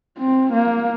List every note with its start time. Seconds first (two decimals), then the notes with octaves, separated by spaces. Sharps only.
0.18 C4
0.53 A#3